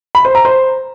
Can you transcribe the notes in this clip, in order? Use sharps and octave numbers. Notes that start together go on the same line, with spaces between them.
B5
C5
A#5
C5